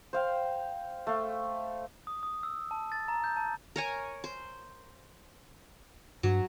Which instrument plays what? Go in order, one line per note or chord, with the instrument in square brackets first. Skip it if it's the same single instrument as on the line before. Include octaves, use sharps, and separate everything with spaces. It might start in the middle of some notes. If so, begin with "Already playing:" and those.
[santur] C5 F5 G5
A3 F5
[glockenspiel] D#6
D#6
E6
A5
A6
A#5
G6
A5
[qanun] A#4 C#5 G#5
C5
[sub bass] G2 [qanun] F#3